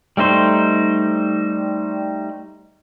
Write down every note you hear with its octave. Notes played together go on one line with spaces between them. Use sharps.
G3 A3 D#4 C5